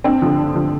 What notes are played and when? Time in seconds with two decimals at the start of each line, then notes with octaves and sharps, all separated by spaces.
0.04 G2 C4
0.22 D3 F3
0.38 G2
0.55 D3 F3